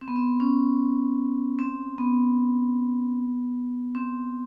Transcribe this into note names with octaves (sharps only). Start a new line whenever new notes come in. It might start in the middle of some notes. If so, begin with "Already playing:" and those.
C4
B3
C4
C#4
C4
B3
C4